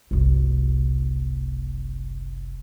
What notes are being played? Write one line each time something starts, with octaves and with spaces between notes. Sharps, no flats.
F#1 C2